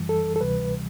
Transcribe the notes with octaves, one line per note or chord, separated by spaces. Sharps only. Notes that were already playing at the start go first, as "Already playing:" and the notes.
Already playing: F#2 E3 G3
A4
A4
D2 C3 E3 G3 B4